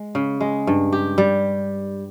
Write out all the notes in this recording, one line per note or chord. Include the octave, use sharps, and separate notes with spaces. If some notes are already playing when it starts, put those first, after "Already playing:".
Already playing: G#3
C#3
G#3
G2
G4
G3